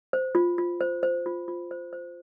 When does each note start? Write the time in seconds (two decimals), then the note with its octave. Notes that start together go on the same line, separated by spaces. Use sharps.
0.13 C5
0.35 F4
0.58 F4
0.81 C5
1.03 C5
1.26 F4
1.48 F4
1.71 C5
1.93 C5